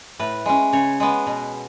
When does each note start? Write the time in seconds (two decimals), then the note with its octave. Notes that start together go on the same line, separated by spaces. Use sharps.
0.19 A2 B4
0.46 G#3 C#4
0.73 C#3 C#5
1.00 G#3 B3
1.27 B2